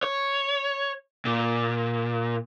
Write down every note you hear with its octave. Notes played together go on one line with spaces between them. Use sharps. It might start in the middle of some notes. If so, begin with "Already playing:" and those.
C#5
A#2